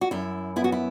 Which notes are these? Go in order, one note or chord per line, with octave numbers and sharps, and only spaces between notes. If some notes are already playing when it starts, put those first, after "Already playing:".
F#4
F#2 E4
B3 E4
F#4
E4